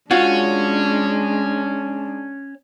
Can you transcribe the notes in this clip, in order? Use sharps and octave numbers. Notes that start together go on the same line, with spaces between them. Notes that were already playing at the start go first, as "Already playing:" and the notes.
G#3 C#4 D4 F4 F#4